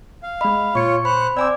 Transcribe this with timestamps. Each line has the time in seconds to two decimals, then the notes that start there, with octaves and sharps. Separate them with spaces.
0.23 F5
0.41 G#3 D#5 B5
0.75 A#2 F4 C#5 C#6 C#7
1.05 C5 B5 F#6
1.37 C4 D5 G#5 D6 E6